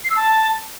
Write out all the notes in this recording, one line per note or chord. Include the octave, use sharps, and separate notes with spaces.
C7
E6
A5